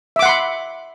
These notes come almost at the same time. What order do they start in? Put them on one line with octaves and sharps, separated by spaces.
E5 D6 F#5 C6 B5